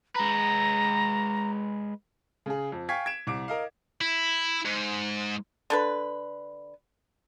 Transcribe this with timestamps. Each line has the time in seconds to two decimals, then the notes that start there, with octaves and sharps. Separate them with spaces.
0.16 G#3 B4 A#5
2.46 C#3 G#4
2.72 F2
2.89 F5 G5 G#5 C#6 G#6 B6
3.06 G#6 D7 E7
3.27 C2 D6 D7
3.48 A#4 D#5 F5
4.01 E4
4.65 G#2
5.70 D3 A4 B4